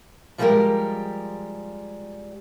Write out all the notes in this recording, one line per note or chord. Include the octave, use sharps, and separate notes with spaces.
F3 G3 G#3 F#4 G4 A#4